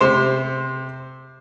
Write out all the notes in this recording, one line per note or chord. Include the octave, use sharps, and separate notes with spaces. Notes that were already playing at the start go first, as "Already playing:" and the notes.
C3 C5